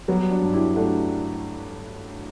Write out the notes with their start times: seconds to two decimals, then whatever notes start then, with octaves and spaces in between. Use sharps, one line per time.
0.08 F#3 G3 B3
0.30 D4 F#4
0.42 G2
0.53 E4 G4
0.76 A3 D4 F#4